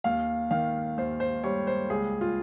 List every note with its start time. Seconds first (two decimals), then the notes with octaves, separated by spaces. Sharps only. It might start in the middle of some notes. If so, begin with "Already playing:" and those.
0.04 D#2 F5
0.51 D#3 F5
0.98 D#2 C5
1.20 C5
1.44 G3 C#5
1.67 C5
1.90 C#2 G#4
2.21 F4